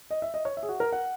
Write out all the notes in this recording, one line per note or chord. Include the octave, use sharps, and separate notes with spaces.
D#5
E5
D#5
C#5
E5
G#4
F#4
A#4
F#5